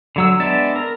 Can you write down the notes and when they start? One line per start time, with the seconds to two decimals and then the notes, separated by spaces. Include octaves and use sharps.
0.16 D3 F#3 E6
0.40 G#3 B3 D4 D5 E5
0.76 A#4